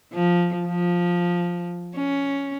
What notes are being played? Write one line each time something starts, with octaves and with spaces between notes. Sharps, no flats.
F3
F3
C#4